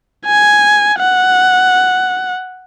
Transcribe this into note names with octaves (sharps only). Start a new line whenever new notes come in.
G#5
F#5